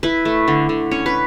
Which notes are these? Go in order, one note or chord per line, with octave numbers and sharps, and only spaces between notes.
E4 B4
A3
D3
D3
C#4 C#5
B4